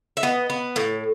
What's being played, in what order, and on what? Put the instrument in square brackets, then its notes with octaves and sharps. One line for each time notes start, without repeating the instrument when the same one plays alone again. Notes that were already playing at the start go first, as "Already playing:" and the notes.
[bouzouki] E5
B3 D#5
B3
A2